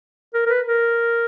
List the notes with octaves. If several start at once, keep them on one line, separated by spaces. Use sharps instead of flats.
A#4
A#4
B4
A#4